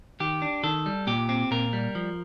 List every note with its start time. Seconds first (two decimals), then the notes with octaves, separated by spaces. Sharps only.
0.20 D#3 G4
0.42 D4
0.63 D#3 A4
0.86 G3
1.07 A#2 G4
1.29 C4
1.51 A#2 A#4
1.73 G3
1.95 F3